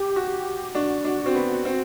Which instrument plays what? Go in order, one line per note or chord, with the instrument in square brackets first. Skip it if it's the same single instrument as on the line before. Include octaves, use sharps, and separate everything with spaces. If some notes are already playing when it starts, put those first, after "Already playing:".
Already playing: [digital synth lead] G4
[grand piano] F#4
[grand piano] D4 [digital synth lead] F#4
[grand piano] D4
C4
B3
C4